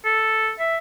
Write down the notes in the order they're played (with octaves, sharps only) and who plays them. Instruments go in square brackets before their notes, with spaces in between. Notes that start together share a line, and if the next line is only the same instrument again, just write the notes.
[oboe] A4
E5